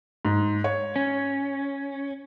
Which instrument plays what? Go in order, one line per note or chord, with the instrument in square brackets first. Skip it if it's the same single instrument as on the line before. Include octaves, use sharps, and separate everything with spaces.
[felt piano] G#2
C#5
[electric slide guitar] C#4